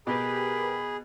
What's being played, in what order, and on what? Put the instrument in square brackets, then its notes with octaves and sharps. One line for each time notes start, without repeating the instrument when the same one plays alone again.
[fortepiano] B2 [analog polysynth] G4 A#4 B4 [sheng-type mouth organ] G#4 [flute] B5